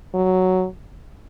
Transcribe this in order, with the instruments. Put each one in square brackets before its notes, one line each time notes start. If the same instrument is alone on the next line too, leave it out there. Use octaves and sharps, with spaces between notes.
[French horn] F#3